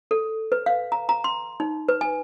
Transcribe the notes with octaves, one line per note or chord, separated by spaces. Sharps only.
A4
B4
F5
A#5
A#5
C6
D#4
B4
G#5